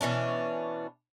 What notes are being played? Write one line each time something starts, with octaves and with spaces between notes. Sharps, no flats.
B2 E3 C#4 D4